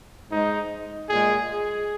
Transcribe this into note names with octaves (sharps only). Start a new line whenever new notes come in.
G#2 G#3 D#4
A#2 G#3 G#4
G#4